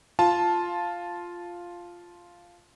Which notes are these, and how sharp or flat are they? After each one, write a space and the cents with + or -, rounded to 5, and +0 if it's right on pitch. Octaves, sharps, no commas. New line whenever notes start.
F4 +0 A5 -10